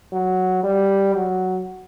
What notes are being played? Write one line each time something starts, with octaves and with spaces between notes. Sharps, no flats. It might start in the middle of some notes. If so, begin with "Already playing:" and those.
F#3
G3
F#3